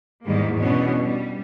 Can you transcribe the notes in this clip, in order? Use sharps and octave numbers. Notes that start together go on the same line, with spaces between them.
E2 G#2 D#3 G3 G#3 A#3
B2 E3 B3 C#4 D4
G3